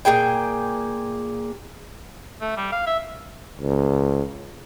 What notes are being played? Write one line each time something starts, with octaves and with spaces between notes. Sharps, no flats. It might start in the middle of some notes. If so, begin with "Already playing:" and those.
A#2 A#3 G#4 G5
A3
G3
F5
E5
C#2